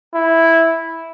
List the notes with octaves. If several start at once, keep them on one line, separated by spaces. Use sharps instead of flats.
E4